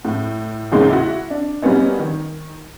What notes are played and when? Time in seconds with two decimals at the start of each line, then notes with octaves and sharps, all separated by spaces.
0.05 A2
0.72 E2 A#2 C#3 G#3 A#3 D#4
0.90 E4 F#4
1.30 D4
1.62 F#3 G3 A#3 B3 C#4 D#4
1.99 D#3